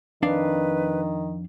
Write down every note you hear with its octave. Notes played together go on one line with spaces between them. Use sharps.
F2 D#3 D4 B4 F5